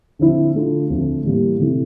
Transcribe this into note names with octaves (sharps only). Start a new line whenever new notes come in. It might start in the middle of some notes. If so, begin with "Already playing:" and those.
D3 F3 C4 E4
D3 A3 D4 F4
D2 D3 F3 C4
A2 E3 G3 A#3
C3 E3 A3 E4